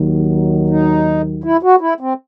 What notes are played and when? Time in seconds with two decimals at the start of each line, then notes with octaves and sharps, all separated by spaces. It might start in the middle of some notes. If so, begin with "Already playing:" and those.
Already playing: D#2 D#3 F#3
0.70 D#4
1.44 E4
1.63 F#4
1.81 E4
2.00 C4